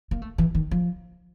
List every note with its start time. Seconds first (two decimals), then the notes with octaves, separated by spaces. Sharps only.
0.11 A#3
0.22 A3
0.38 E3
0.55 D#3
0.71 F3